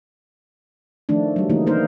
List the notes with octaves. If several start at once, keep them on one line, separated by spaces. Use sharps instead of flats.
D#3 F3 A3 D4
F#3 G3
C#3 E3 A3 A#3 D#4
D#3 A#3 D#4 A#4 C5